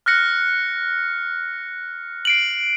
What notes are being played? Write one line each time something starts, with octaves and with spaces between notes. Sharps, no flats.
F6 F#6 A#6 C#7
C7 D7 F#7